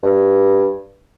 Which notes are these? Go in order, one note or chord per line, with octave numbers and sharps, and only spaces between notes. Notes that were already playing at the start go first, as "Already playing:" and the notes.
G2